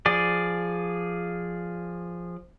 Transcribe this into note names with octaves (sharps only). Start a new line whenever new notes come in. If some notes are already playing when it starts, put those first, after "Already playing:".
F3 G#4 D5